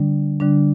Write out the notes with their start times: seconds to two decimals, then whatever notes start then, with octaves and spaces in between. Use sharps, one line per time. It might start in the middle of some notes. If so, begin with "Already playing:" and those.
Already playing: D3 G3 D4
0.40 D3 G3 D4